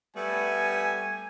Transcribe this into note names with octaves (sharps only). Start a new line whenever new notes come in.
G3 A3 B3 G#5